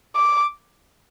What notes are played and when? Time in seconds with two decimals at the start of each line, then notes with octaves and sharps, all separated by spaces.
0.16 D6